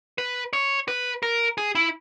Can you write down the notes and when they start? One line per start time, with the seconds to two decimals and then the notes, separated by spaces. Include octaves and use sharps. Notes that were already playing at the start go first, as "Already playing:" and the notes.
0.18 B4
0.53 C#5
0.88 B4
1.23 A#4
1.58 G#4
1.75 E4